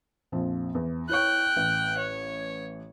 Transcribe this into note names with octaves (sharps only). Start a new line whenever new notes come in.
A#1 F2 F3
E2
E4 C#5 G5 C#6 F#6
A1
C#5